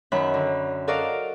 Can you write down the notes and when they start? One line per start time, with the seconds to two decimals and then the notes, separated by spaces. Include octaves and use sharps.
0.12 F#2 D#3 F#3 E5 B5 F#6
0.34 D3
0.88 F#4 A4 A#4 D5 D#5 F5